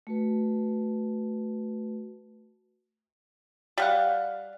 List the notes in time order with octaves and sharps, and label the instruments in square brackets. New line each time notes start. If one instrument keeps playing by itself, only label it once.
[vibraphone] A3 F#4 B4
[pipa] G3 F5 F#5